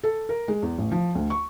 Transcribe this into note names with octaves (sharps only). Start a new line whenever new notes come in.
A4
A#4
G#3
E2
A1
F3
D2
C#6